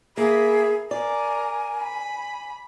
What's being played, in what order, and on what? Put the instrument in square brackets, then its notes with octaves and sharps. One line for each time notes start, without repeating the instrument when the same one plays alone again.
[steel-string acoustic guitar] A#3 [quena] G#4 [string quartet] A#4 E5 B5
[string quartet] A#4 [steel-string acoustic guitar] D5 [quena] G#5
[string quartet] B5